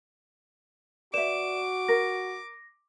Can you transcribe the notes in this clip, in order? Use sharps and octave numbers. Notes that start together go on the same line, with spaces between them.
F#4 B4 D5 E5 D6 E7
A#4 A#6